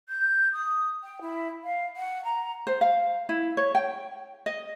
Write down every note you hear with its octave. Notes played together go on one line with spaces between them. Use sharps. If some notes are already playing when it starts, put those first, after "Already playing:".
G6
D#6
G5
E4
F5
F#5
A#5
C5
F5
E4
C#5
G5
D#5